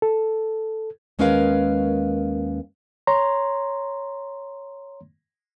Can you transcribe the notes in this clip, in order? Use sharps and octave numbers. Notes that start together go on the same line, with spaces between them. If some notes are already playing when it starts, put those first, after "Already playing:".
A4
D#2 G#3 C#4 A#4 B4 F5
C#5 A#5 C6